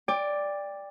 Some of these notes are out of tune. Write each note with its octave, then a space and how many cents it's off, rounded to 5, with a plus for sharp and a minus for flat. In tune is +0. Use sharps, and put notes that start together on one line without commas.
D5 +0 G5 +25